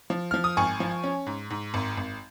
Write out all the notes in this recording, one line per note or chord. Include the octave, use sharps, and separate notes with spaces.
F3
F3 F6
D#6
G#1 G#5 C#6
F3
C#4
G#2
G#2
G#1
G#1